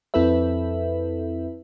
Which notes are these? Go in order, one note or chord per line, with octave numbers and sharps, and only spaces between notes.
F2 C4 E4 A4 B4 E5